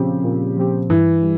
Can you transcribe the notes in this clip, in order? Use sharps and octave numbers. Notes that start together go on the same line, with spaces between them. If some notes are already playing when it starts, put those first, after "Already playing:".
Already playing: A#2 C#3 F3 C4 G4
A#2
F3 C4 G4
G2 E3
G3